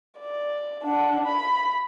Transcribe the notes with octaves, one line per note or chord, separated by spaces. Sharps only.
D5
D4 F#5
B5